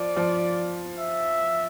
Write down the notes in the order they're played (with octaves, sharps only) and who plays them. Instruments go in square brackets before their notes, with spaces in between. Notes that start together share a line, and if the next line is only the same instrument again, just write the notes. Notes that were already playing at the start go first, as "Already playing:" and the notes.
Already playing: [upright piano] F3 [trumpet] D5
[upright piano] F3
[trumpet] E5